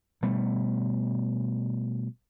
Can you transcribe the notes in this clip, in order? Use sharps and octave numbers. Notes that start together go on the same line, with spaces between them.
B2 G3 A3